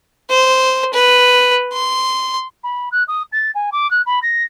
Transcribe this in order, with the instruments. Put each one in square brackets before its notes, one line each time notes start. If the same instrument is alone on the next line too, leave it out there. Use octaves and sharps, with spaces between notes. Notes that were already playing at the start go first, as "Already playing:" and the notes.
[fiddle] C5
B4
C6
[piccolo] B5
F#6
D#6
A6
G#5
D6
F#6
B5
A#6